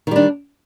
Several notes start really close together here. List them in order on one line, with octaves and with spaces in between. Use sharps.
D#3 G3 D4